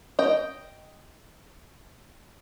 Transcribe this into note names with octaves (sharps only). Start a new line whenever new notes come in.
D#5 G5